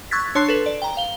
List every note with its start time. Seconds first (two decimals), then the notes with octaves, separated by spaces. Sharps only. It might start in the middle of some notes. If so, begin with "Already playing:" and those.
0.11 C#6 E6 F#6 G#6 A6 B6
0.35 D4 C#5 A5 C6 F#6 C7
0.48 A4 B4
0.66 D5
0.82 G5 A#5
0.97 F5 G7